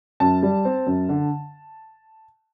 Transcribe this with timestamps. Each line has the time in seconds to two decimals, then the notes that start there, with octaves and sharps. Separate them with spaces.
0.20 F#2 A5
0.43 G3
0.65 C4
0.87 F#2
1.09 D3